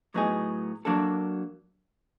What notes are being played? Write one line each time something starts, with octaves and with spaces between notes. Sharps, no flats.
A2 F#3 B3 D#4 G#4
F#3 A#3 D4 F#4 A4